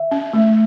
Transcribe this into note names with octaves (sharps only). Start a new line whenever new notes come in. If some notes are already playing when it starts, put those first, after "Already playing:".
Already playing: E5
C#4
A3